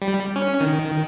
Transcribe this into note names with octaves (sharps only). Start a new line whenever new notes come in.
G3
C#4
D#3